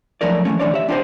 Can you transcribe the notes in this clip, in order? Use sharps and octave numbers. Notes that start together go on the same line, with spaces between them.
F3 F#3 A3 D4 A#4 D5
E3 F#3 A3 C#4
D3 E3 D4 C#5 D5
G4 E5
D4 F4 G4 A#4 C5 D#5